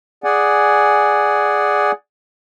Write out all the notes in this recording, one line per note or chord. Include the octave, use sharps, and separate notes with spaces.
G#4 D5 F#5 G#5